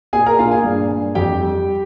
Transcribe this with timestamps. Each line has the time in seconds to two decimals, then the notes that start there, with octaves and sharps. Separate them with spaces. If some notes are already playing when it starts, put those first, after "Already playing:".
0.13 A#2 G#4 G#5
0.26 A#4 A#5
0.39 A#2 F4 F5
0.51 G#4 G#5
0.64 G2
0.90 G2
1.15 F2 G4 G5
1.41 G3